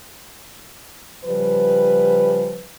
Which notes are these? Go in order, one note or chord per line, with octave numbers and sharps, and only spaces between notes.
C#3 F3 G3 B4